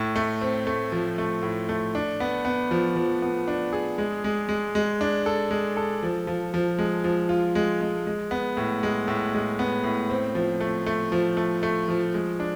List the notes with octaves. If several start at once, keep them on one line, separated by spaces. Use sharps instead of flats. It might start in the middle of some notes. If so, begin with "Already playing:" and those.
Already playing: A2
A3
C4
A3
F3
A3
A2
A3
D4
B3
B3
F3
F3
B3
D4
G#4
G#3
G#3
G#3
G#3
D4
A4
G#3
A4
F3
F3
F3
G#3
F3
F4
G#3
G#3
G#3
B3
A2
G#3
A2
G#3
B3
A2
C4
F3
A3
A3
F3
A3
A3
F3
G#3
D4